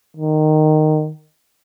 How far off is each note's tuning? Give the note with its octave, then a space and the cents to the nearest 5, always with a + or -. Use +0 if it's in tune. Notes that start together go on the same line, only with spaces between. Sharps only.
D#3 -15